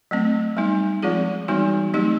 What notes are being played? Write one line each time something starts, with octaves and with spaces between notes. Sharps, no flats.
F#3 A3 C4
G3 B3 D#4
F3 G#3 C4 F4 G#4
E3 G3 B3 D#4 F#4
F#3 A3 C4 D#4 G4